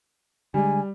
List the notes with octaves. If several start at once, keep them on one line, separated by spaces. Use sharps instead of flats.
D3 G3 G#3 G#5